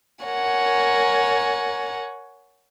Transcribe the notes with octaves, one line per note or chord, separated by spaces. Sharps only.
A#4 C#5 F#5 G#5